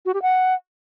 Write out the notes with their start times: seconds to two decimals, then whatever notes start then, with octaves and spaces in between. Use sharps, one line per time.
0.06 F#4
0.14 G4
0.22 F#5